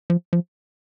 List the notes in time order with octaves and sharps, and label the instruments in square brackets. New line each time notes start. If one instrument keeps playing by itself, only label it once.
[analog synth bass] F3
F3